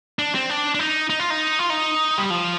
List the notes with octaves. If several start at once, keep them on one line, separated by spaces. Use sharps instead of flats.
D4
C4
D4
D4
D#4
D#4
F4
D#4
F4
D#4
G3
F3